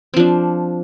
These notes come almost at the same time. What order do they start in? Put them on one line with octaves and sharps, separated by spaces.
C4 F3 D4